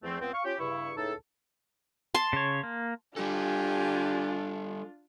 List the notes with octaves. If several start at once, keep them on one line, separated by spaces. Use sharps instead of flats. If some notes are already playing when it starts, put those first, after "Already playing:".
E2 F3 A3 C4
C#2 B3 C4
F5 C#6
C#4 F4 G4
G2 C#3 E4 C#6
C#2 A2 D#4 G#4 A4
A5 C6
C#3 C#5
A#3
G3 D4 F4 G4 A4 G#5